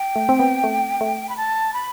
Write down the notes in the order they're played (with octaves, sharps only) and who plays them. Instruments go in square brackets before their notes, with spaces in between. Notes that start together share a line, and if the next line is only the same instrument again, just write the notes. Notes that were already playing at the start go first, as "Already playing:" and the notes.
Already playing: [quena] G5
[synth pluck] A3
C4
B3
A3
A3
[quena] B5
A5
B5